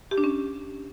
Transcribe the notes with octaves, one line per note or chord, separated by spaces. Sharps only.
G4
D4
C#4